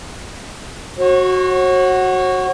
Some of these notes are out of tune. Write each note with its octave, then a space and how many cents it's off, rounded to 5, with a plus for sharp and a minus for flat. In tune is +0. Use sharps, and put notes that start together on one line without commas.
F#4 +0 C#5 -40